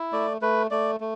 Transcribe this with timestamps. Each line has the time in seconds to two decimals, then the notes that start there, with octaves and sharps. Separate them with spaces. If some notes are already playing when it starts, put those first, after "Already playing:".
Already playing: E4
0.13 A3 D5
0.42 A3 B4
0.71 A3 D5
1.00 A3